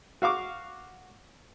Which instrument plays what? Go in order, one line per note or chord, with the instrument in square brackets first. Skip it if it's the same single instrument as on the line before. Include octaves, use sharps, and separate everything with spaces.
[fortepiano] F#4 F5 C#6 D6